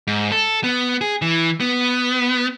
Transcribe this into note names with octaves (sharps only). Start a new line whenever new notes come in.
G#2
A4
B3
G#4
E3
B3